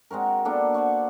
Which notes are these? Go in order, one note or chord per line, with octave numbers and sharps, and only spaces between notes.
G#3 C4 F#4 A#4
A#3 B3 D4 A4
C5 D5 F#5 C#6